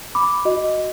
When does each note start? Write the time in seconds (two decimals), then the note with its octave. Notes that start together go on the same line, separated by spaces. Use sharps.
0.15 B5 D6
0.45 F#4 D#5